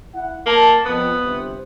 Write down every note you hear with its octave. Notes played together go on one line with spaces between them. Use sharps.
E4 F#5
A#3 A5
F2 B3
G1 C3 C5